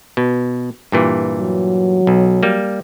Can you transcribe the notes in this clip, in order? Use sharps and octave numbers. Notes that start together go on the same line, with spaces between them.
B2
G2 A#2 E3
F#3
B1
G3 A#3